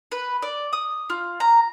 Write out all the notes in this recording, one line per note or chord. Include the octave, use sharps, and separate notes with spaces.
B4
D5
D#6
F4
A#5